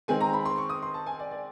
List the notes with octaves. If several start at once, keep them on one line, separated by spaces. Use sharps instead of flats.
D#3 G#3 C4 G#5
A#5
B5
C6
C#6
D#6
C6
A5
G#5
D5
D5